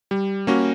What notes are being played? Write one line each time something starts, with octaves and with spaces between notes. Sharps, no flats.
G3
A#3 C#4 F#4